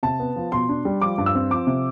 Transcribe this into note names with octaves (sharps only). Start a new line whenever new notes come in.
C3 A5
B3
F3
B2 C6
D4
G3
F3 D6
G2
E6
C4
F3 D6
C3